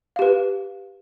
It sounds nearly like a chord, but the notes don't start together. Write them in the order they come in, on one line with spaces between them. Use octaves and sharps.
F5 G4 B4